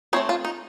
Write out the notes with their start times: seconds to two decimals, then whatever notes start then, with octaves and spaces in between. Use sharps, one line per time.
0.13 A3 C4 D#4 C#5
0.29 F4
0.45 D#4